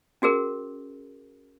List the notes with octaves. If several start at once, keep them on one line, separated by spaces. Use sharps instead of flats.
C#4 F#4 G#4 A#4